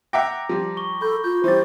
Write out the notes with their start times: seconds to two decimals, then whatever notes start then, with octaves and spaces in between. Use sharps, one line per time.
0.13 E5 F#5 G5 A#5 D6 A#6
0.49 F3 G3
0.77 C#6 G7
1.02 A4 B5 G6
1.24 F4 G6
1.44 E3 G3 C5 C6 D6 A6